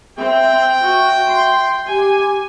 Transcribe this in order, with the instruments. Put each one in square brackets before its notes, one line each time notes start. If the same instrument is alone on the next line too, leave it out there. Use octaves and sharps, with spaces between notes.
[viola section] C4 [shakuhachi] E5 [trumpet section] G5
[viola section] F#4 [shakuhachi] E5
[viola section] C6
[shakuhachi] G4 [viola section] G#5